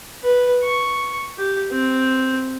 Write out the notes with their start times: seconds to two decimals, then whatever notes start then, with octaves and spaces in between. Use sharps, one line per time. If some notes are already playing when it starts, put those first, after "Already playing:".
0.23 B4
0.64 C#6
1.38 G4
1.71 C4